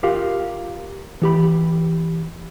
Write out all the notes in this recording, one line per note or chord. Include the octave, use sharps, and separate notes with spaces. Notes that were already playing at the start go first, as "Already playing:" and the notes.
F4 G4 A#4 F5
E3 G4 B5